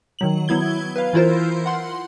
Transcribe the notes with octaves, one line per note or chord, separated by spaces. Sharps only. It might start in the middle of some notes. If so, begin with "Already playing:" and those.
D#3 F#3 F#7
F#3 B3 E4 G#6 G7
B4 F5
E3 E4 F4 A#4 C5
F#5 C6